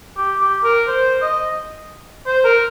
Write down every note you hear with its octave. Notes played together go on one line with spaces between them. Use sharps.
G4
G4
A#4
C5
D#5
C5
A#4